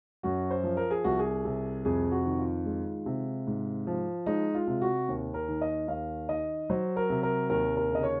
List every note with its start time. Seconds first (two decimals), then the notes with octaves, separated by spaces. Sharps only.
0.23 F#2 F#4
0.51 C5
0.64 F3
0.77 A#4
0.91 G#4
1.04 C2 F#4
1.19 G#4
1.45 C3
1.85 F2 G#4
2.12 F#4
2.25 D#3
2.39 F4
2.65 G#3
3.06 C3
3.47 G#2
3.87 F3
4.26 G#3 D#4
4.55 F4
4.67 C3
4.81 F#4
5.08 D#2
5.34 A#4
5.48 D#3
5.61 D#5
5.88 D#2 F5
6.29 D#3 D#5
6.70 F#3 C5
6.96 A#4
7.10 C3
7.23 A#4
7.49 D#2 A#4
7.77 A#4
7.90 C#3
7.95 D#5
8.03 C#5